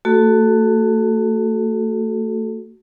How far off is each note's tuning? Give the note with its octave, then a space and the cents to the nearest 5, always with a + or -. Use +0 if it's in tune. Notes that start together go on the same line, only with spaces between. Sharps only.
A3 +30 F#4 +10 A4 -10